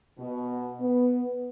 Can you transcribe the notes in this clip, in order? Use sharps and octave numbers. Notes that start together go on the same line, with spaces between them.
B2
B3